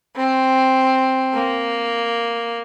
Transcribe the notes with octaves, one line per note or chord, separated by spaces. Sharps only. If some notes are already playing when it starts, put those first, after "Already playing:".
C4
A#3